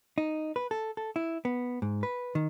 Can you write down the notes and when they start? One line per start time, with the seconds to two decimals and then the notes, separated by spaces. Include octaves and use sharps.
0.18 D#4
0.56 B4
0.71 A4
0.97 A4
1.16 E4
1.45 B3
1.82 G#2
2.03 B4
2.35 D#3